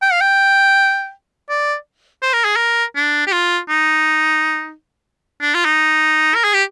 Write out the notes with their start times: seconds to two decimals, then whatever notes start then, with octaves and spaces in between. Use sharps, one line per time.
0.02 G5
0.12 F5
0.21 G5
1.49 D5
2.22 C5
2.33 A#4
2.45 G#4
2.56 A#4
2.96 D4
3.27 G4
3.32 F4
3.69 D#4
5.41 D4
5.54 F4
5.65 D#4
6.35 A#4
6.44 G#4
6.53 G4